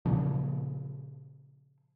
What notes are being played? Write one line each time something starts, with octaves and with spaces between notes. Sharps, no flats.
A#2 C#3 F3